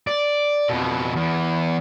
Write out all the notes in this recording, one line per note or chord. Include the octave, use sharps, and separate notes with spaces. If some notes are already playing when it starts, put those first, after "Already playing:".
D5
F2 B2
E2